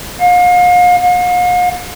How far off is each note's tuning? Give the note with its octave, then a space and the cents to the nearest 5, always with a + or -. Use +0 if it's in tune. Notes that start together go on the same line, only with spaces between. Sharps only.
F5 +40
F5 +45